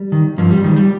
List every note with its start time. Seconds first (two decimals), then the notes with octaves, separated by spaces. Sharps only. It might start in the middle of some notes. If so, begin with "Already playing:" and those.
Already playing: G3
0.12 D#3
0.38 G2 F3
0.51 G3
0.64 D#3 G3
0.76 G3